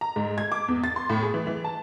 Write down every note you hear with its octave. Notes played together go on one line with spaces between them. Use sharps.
A#5
G#2
G#6
D6
E2
A6
C6
A2
G#4
E3
E3
A5